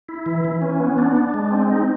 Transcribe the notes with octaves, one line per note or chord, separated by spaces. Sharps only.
E4
E3
E3
C#4
B3
D4
D4
G#3
C4
D#4